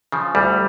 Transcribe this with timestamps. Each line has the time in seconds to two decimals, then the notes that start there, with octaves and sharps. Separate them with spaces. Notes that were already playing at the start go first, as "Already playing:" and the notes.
0.12 C#3 F3
0.35 D2 G3